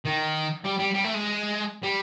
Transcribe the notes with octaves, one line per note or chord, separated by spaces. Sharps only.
D#3
G3
G3
G3
A3
G#3
G3